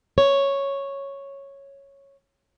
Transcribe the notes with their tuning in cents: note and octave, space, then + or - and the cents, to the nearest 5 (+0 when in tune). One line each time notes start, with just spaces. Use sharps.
C#5 -5